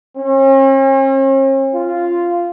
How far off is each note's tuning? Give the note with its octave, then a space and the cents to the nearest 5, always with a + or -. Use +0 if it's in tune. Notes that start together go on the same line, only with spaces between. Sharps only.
C#4 -45
F4 -10